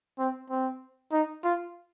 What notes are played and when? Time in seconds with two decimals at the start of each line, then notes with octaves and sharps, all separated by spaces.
0.19 C4
0.50 C4
1.12 D#4
1.44 F4